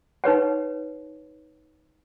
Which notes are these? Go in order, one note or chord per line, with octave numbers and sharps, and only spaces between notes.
D#4 B4 C#5 F#5